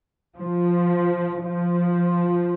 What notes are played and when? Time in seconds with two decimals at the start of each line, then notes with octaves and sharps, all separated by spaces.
0.36 F3
1.42 F3